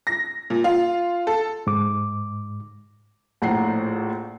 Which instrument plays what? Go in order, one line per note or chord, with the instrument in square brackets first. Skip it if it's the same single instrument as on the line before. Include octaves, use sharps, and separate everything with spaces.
[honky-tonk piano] A#6
A#2
F4
A4
[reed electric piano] G#2 D6
[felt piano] A#1 A2 F#5 A#5 C7